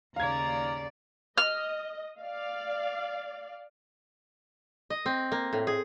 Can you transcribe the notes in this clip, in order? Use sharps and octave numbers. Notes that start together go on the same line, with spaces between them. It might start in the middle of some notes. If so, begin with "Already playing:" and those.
D#2 C#3 D5 F5 A#5 G#6
D#5 F6
D5 F5
D#5
C4
A#3
A2
G#4